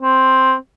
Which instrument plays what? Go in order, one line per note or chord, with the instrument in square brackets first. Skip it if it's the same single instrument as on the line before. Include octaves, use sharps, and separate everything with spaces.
[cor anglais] C4